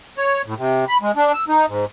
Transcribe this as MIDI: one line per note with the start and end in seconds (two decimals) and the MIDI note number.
0.17 0.42 73
0.46 0.54 45
0.58 0.85 48
0.88 0.97 83
1.02 1.12 56
1.16 1.32 62
1.33 1.44 88
1.48 1.66 63
1.67 1.85 44